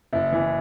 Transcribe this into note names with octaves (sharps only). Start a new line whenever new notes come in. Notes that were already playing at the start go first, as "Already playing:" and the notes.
F#1 E4
E3